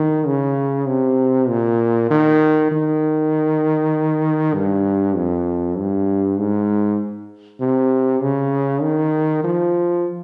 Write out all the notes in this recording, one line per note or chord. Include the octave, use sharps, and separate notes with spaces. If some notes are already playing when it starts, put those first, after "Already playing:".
Already playing: D#3
C#3
C3
A#2
D#3
D#3
G2
F2
G2
G#2
C3
C#3
D#3
F3